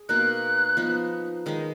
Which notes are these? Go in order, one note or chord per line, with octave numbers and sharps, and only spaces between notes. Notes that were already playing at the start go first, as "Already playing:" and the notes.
Already playing: G#4
B2 A#3 D#4 A#4 F#6
F3 B3 D#4
D#3 G#3 D#4